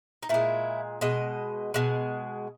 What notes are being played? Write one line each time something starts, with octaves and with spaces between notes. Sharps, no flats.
D#4
A#2 G#3 E4
B2 G#3 D#5
B2 G#3